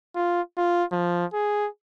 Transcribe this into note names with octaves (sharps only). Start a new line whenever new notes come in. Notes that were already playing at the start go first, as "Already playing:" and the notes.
F4
F4
F3
G#4